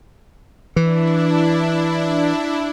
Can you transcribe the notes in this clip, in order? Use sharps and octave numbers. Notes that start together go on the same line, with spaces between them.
E3 D4 E4